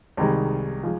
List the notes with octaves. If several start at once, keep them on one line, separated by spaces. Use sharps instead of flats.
C2 C3 D#3 G#3
F3 G#3